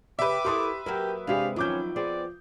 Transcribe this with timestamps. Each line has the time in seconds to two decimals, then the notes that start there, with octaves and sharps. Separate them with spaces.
0.19 C#3 G4 B4 E5 D6
0.45 E4 G4 A4 A#4 C6 D#6
0.86 F#3 A#3 F#4 G4 A#4
1.27 C3 G#3 D4 G4 G#4 F5
1.56 D#3 F3 F#3 C#4 D6 G6
1.96 B3 C4 G#4 D5